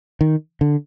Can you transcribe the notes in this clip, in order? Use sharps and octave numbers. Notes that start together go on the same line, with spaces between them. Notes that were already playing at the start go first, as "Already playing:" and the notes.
D#3
D3